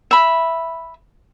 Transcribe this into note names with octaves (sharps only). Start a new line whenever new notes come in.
E5 B5